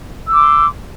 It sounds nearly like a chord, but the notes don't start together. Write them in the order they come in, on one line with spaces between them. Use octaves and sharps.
E6 D6 C6